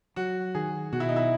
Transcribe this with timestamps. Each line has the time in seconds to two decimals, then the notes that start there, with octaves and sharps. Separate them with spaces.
0.16 F#3 F#4
0.55 D#3 G#4
0.93 B2 F#4
1.00 E4
1.09 D#4
1.16 E4